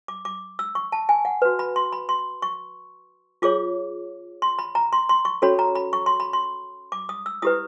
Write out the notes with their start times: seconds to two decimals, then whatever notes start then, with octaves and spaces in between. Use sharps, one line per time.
0.08 D6
0.25 D6
0.59 E6
0.75 C#6
0.92 A5
1.09 G#5
1.25 F#5
1.42 F#4 B4
1.59 B5
1.76 C6
1.93 B5
2.09 C6
2.42 C#6
3.42 F4 G#4 C#5 D6
4.42 C6
4.59 B5
4.75 A#5
4.93 C6
5.09 C6
5.25 C#6
5.42 C#4 F#4 A4 C#5 B5
5.59 A#5
5.75 B5
5.93 C#6
6.06 C6
6.20 B5
6.33 C6
6.92 D6
7.09 D#6
7.26 E6
7.42 E4 G4 B4 D#6